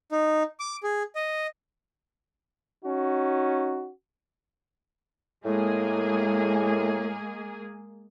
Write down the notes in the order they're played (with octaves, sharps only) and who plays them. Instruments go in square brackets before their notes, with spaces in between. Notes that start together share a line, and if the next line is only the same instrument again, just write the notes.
[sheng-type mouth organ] D#4
D6
G#4
D#5
[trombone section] C#4 D#4 F#4
[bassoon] A2 [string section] G#3 A#3 G#4